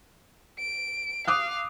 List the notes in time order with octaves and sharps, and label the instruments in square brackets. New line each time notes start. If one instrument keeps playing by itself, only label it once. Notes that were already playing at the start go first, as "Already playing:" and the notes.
[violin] D7
[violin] F5 [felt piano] D6 D#6 F#6